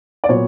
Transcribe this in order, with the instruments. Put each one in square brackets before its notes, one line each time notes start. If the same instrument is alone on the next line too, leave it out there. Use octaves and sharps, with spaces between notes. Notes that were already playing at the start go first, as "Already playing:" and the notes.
[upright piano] D5
A#2 F#3 B3 C#5